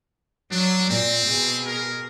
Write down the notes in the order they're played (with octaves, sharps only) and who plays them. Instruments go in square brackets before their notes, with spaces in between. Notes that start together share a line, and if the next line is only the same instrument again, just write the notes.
[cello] F#3 [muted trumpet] D4
[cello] A#2 [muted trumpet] C4
[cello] B2 G#4
[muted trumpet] A#4